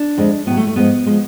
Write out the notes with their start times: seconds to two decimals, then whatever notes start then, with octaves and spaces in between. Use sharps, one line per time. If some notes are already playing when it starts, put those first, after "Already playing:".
Already playing: D4
0.18 F2 D3 G#3
0.46 A2 F#3 B3
0.57 A3
0.67 A3
0.76 G#2 F3 G#3 B3
1.06 F3 G#3